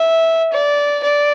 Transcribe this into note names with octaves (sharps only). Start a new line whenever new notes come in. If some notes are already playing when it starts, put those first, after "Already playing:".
Already playing: E5
D5
D5